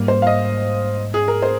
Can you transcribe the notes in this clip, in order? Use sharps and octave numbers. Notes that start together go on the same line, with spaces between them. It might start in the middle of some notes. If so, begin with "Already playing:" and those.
Already playing: G#2 G3 A#3
C5
F5
D#5
G#4
A#4
C5